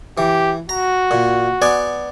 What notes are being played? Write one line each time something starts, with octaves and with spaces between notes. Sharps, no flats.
E3 G4
F#4 A#5
A#2
B3 D5 G#5